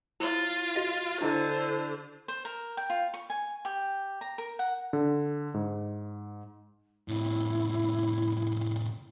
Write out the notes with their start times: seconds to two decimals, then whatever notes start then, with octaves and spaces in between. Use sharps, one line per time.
0.20 E4 F4 C#5
0.76 F#4 D#5 F5
1.21 D3 D4 E4 C5 D#5
2.28 C5
2.45 A#4
2.77 G5
2.90 F4
3.14 C#6
3.30 G#5
3.65 G4
4.21 A#5
4.38 A#4
4.59 F#5
4.93 D3
5.54 G#2
7.08 A2 C3 E4